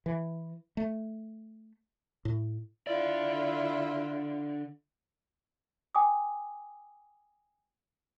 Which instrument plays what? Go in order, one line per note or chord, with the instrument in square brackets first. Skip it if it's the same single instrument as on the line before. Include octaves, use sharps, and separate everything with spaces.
[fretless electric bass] E3
A3
A2
[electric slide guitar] D3 D5 [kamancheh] E4 F4
[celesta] G5 G#5 D6 D#6